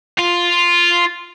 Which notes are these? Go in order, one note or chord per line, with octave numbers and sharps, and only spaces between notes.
F4